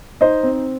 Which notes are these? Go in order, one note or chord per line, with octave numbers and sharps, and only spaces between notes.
D#4 C5 D#5
C4